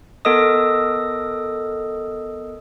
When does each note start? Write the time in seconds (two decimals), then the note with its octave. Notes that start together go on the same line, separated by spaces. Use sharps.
0.25 B3 A4 A#4 D#5 D#6